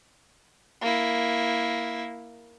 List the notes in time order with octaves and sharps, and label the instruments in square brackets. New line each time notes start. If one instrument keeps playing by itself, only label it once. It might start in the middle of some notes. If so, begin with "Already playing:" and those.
[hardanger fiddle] A#3 E4